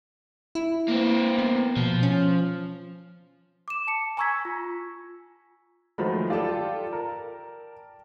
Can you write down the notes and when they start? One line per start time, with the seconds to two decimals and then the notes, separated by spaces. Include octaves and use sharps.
0.55 E4
0.88 A#3 C4
1.38 B3
1.77 B2 F3
2.03 C#4
3.68 D6 E7
3.87 A5 C#7
4.17 G#5 A#5 C#6 E6 G#6 B6
4.45 F4
5.98 D#3 F3 F#3 G#3 A3 B5
6.30 F4 G4 A4 D5 G5 A5
6.93 A#4